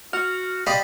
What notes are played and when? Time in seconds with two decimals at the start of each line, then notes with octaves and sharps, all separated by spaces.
0.13 F#4 F#5 F6
0.67 G4 C5 D5 D#5 F5 B5